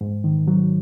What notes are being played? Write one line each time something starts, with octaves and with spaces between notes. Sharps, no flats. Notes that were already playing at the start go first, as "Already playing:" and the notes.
G#2
D#3
F#3